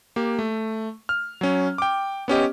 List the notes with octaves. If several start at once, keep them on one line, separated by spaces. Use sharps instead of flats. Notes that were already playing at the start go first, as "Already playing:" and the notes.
A#3 G4
A3
F6
F#3 C#4
G5 D6
B3 C#4 G4 D#5